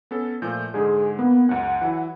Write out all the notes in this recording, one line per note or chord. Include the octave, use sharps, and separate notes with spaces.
B3 C#4 A4
A#2 F3 A3 G6
G#2 D3 G#3 G#4
A#3 B3
C#2 F#2 F#5
E3 F#3 E4